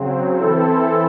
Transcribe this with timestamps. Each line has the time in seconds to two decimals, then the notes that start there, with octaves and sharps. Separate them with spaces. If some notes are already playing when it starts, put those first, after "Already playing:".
Already playing: C#3 F#3 C4
0.35 E3 C4 E4 A4